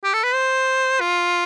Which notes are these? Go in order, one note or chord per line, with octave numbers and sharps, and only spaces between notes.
G4
A4
B4
C5
F4